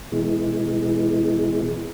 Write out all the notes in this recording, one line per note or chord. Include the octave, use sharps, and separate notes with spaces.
B2 E3 G#3